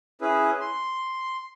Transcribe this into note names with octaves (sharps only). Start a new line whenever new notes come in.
C#4 E4 G#4 B4
C6